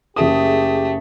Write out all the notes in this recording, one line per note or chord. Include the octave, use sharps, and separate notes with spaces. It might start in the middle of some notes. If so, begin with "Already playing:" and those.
F#1 A3 G4 G#4 D#6